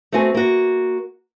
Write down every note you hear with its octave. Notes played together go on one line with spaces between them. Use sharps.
A3 B3 C4 F#4 G#5
A#3 F#4